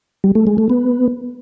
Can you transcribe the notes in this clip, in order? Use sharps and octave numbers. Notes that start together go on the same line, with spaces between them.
G3
A3
G#3
A3
B3